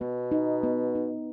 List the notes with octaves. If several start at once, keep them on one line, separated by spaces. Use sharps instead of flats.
B2 B3
D#4
B3
D#4